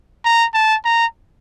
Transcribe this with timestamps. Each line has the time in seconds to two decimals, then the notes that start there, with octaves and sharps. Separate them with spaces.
0.25 A#5
0.54 A5
0.85 A#5